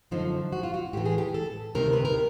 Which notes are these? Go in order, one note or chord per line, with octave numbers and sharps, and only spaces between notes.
F#2 D3 F3 D#4
F#4
F4
F#4
A2 E3 G4
G#4
G4
A4
D2 C3 D#3 A#4
B4
A#4